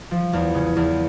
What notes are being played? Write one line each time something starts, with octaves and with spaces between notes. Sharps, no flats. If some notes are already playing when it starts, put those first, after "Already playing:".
F3
E2
C#3
E2